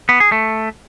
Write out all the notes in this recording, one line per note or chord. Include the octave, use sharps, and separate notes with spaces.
B3
G#4
A3